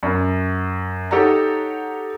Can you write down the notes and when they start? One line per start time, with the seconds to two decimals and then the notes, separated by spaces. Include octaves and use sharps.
0.03 F#2
1.11 D#4 G4 A4 C#5 F#5 A#5